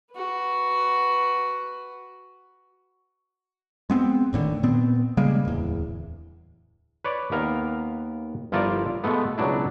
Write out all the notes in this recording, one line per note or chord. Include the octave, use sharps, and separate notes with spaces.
F#4 B4
G#3 B3 C4
F1 A2 D3 D#3
A#2 B3 C4
C#3 G3 G#3 A#3
D1 E2
B4 C#5 D5
D#2 B3 A#4 F5
G1 F3 E4 F4 A#4 D5
B2 G#3 A3 B3
C#2 B2 F#3 D4 E4